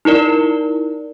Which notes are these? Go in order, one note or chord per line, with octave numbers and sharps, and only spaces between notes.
D#4 E4 A#4 D5